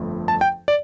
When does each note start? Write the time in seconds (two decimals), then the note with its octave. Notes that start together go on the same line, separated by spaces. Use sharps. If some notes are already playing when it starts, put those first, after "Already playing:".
Already playing: G1 F2 F3 A3
0.28 A5
0.41 G5
0.68 D5